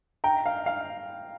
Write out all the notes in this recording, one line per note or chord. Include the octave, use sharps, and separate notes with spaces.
G5 A#5
F5
F5